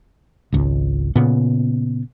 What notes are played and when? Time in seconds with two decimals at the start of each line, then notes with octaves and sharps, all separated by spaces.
0.52 G#1 C#2
1.16 A#2 C#3 B3